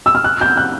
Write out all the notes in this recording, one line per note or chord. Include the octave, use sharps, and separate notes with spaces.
E6
F6
F#6
G6
F#6